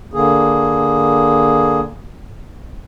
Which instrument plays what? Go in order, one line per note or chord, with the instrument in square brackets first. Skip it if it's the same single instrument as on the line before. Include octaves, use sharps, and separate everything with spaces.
[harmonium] D3 A#3 G#4